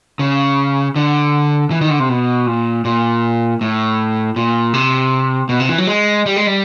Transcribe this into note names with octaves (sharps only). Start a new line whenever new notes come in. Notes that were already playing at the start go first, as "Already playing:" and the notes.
C#3
D3
E3
D#3
D3
C3
B2
A#2
A#2
A2
A#2
C3
B2
C3
E3
F#3
G#3
G3
G#3
G3